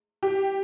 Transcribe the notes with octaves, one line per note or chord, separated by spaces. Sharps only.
G4